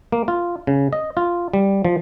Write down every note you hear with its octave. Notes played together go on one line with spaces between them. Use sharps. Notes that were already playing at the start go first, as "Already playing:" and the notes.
A#3
F4
C#3
D#5
F4
G3
F3